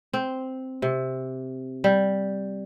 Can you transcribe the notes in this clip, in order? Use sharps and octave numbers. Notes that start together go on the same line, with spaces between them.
C4
C3
G3